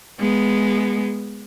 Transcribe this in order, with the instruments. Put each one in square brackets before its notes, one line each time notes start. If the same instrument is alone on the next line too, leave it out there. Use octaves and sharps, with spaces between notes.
[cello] G#3 B3